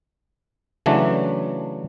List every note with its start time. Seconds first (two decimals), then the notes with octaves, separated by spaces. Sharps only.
0.86 C#3 E3 F#3 A3 D4